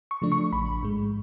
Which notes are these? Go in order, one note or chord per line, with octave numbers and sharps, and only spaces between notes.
C#6
C#3 F3 A3 D4
C#6
A1 B5
G#2 G#3